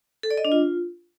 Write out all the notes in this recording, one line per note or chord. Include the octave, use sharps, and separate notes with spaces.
A4
D5
D#5
D4
F4